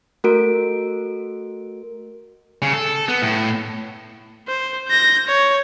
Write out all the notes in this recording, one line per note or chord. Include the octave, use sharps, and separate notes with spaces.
A3 F#4 A#4 D7
C#3
A4
B3
A2
C5
G6 A#6
C#5